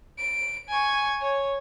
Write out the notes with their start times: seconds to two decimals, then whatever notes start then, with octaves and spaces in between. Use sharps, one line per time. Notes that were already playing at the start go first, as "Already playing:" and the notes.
0.19 D7
0.69 G#5 C#6
1.21 C#5